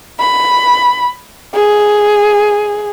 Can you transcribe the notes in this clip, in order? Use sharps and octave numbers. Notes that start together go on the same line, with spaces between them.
B5
G#4